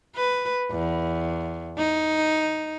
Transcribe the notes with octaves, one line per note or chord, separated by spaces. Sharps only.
B4
E2
D#4